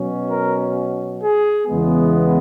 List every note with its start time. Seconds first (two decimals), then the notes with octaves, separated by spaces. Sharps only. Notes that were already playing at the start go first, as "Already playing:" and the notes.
Already playing: B2 F#3 C#4
0.30 A#4
1.22 G#4
1.67 E2 C#3 E3 G#3 B3